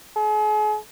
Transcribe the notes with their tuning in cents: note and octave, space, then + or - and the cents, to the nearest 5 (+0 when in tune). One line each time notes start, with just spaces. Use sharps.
G#4 +40